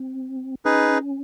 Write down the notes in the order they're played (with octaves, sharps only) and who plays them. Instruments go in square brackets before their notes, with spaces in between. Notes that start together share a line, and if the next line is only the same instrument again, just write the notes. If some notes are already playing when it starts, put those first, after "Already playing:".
Already playing: [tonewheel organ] C4
[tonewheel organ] C#4 [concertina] D#4 G#4 B4